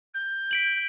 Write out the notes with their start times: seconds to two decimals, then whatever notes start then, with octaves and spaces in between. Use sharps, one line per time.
0.14 G6
0.51 B6 D7 F#7